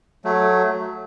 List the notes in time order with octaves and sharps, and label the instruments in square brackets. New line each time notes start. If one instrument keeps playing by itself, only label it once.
[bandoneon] F#3 A3